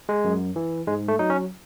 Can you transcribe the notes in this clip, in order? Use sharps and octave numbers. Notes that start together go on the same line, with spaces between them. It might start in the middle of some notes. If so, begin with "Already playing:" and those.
G#3
F#2
E3
G#2 G#3
A3
F#3 D#4
C#4